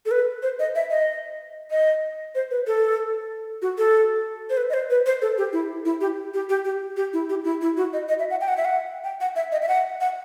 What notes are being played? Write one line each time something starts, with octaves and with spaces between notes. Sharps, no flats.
A4
B4
C5
D#5
E5
D#5
D#5
C5
B4
A4
F#4
A4
C5
B4
D#5
C5
B4
C5
A4
G4
E4
E4
G4
G4
G4
G4
G4
E4
G4
E4
E4
F#4
D#5
D#5
E5
F#5
G5
F#5
E5
F#5
G5
F#5
E5
D#5
E5
F#5
F#5